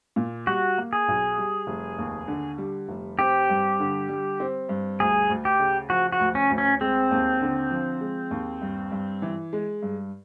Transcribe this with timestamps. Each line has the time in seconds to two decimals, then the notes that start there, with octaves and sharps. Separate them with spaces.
0.16 A#2
0.46 G3 F#4
0.78 A#3
0.93 G#4
1.08 B1
1.38 G3
1.67 F1
1.98 D#2
2.28 D3
2.58 G3
2.89 F1
3.19 C4 G4
3.49 G2
3.80 D3
4.09 G3
4.40 C4
4.69 G2
5.00 D2 G#4
5.30 D2
5.45 G4
5.59 C#3
5.90 F3 F#4
6.12 F#4
6.20 D2
6.35 C#4
6.50 D2
6.58 C#4
6.81 G#3 C4
7.11 D#2
7.41 D3
7.71 F3
8.01 G#3
8.31 D#2
8.61 G2
8.91 G2
9.22 E3
9.53 G#3
9.82 G2